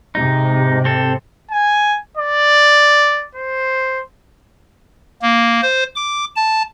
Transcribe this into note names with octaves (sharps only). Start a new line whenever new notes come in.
G#2 C3 D#4
C4 A4
G#5
D5
C5
A#3
C5
D6
A5